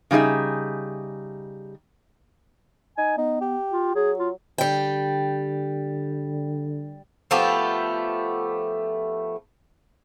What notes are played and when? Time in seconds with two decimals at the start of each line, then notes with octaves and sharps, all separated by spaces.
0.11 C#3 G3 D#4 G#4 E5
2.98 D#4 G#5
3.18 B3 D#4
3.41 G4
3.72 F4
3.95 F#3 G#4
4.19 F4
4.58 D3 G3 G5
7.31 F3 A3 B3 G4